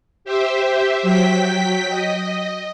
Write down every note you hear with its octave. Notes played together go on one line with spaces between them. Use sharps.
G4 C5 E5
F#3 G5 B6
D#5